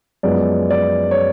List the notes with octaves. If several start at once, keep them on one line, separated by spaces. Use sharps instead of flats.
F#2 F3 G#3 B3 D5
D5
C#5